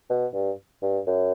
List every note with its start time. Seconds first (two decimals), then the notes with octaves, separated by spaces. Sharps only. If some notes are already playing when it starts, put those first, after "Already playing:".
0.10 B2
0.34 G2
0.82 G2
1.07 F#2